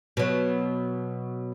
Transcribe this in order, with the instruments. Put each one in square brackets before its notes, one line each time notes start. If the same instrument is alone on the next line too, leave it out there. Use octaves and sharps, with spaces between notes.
[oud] B2 F#3